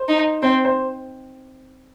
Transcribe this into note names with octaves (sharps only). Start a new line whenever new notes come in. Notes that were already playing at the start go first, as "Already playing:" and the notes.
Already playing: C5
D#4
C4 C5
C5